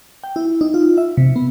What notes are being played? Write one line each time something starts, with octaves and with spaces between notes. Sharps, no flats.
G5
E4
D#4
F4
E5
C3
B3